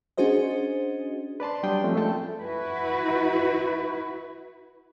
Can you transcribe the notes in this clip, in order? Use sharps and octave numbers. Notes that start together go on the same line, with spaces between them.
C#4 D4 F#4 G#4 C5 D#5
B4 D5 A5 C6
F#3 G3 D4 G5 C6 D#6
F3 A3 C4 C#4
G#3 A3 F4 A4 G5 A5
E4 F#4 B4